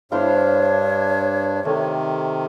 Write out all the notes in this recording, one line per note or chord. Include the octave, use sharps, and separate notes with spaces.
G2 D4 E4 C5 C#5 F5
C3 D#3 A3